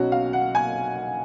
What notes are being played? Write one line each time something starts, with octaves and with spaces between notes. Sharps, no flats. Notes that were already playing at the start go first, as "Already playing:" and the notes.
Already playing: B1 B2 F#3 C#4 F#4
F5
F#5
G#5